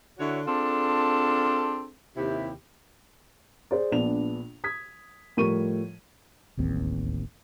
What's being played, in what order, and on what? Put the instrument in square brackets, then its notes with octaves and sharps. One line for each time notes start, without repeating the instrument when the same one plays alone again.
[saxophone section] D3 E4 F#4 C#5
C4 D4 F4 G#4 A4
D#2 C3 E4 G4
[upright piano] G#4 C5 D5
A#1 B3 D4 F7
D#6 G#6 B6
A2 F3 G3 A#4 C#6 D#7
[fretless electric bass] D1 A1 D#2 C4